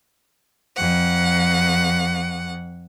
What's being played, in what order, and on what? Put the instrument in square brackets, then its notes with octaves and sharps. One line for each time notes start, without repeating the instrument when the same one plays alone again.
[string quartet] F2 F#5